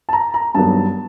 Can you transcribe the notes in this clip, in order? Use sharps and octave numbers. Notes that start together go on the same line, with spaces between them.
A5
A#5
A#5
G2 D#3 F#3 B3 A5